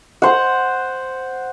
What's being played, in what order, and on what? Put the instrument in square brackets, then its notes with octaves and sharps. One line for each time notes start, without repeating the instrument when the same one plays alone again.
[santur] C5 F#5